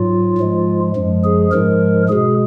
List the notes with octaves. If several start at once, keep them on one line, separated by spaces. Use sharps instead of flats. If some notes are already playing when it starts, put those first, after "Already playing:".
Already playing: G#2 F#3 F4
G#2 F3 G#3
F#2 F3 G#3
G#4
G#2 F3 G#3 A#4
B2 G#3 G#4